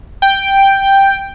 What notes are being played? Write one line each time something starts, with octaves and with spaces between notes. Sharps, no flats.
G5